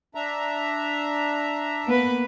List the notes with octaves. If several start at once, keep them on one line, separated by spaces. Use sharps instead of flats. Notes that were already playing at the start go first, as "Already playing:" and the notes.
D4 E5 A#5
A#3 B3 B4